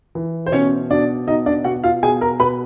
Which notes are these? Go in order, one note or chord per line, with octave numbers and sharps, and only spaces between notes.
E3
C5
B2 C#4 C#5
B2 D4 D5
B2 D#4 D#5
D4 D5
B2 F#4 F#5
F4 F5
B2 G#4 G#5
A#4 A#5
B2 B4 B5